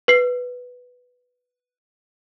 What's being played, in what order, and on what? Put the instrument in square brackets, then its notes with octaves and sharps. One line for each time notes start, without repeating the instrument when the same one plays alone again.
[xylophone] B4 C7